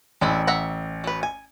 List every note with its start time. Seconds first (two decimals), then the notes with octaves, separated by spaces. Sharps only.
0.21 A1 G#3 D4 E4
0.47 E5 F#5 A#5
1.04 F#3 B4
1.23 G#5